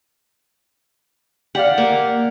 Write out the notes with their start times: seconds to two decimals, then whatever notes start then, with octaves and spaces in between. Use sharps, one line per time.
1.55 G4 D5 F5 F#5
1.78 A#3